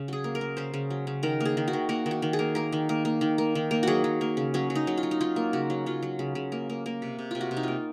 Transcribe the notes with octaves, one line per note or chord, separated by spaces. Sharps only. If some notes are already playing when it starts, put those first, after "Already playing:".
Already playing: C#3
F#3 G#4
A#3
A#4
A#3
C#3 C5
C#3
F#3
C#3
D#3 A#4
A#3 G#4
D#3
F#4
D#3
A#3 F#4
D#3
F#4
D#3
G#4
A#3
A#3 A#4
D#3
A#3
A#3
D#3
A#3
D#3
A#3
F#3 F#4 G#4
F#3
A#3
C#3
F#3 C#4
F#3
D#4
F#3
F4
F#3
D#4
F#3 F4
A#3
C#3 F#4
F#3
F#3 F4
F#3
C#3
C#3
A#3
A#3
A#3
C3
C3
C3 F4
F#4
C3
D#4
A#3 F4